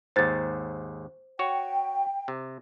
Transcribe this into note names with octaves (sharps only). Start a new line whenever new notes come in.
D#2 G#2 C5 A6
F#4 C#5 G5
C3